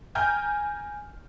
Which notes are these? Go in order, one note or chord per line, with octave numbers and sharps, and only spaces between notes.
G5 G#5 A#5 F6 G6